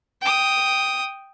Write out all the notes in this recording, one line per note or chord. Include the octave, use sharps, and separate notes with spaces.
G5 D#6